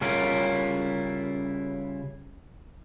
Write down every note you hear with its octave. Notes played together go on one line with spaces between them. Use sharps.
C#3 G3 C#4 E4 F4 A#4